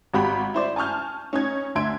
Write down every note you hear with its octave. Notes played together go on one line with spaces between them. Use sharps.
G#1 F#4 G4 B5 B6
E4 C5 D5
G#5 A5 C#6 F6 G6
C#4 D#4 G#6
D2 D4 E5 C6 G#6 D7